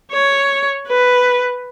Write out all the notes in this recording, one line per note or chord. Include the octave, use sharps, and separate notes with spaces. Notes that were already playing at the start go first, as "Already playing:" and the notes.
C#5
B4